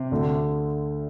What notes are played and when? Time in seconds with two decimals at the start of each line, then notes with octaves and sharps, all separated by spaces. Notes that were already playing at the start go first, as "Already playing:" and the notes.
Already playing: C3
0.11 D2 D3 A3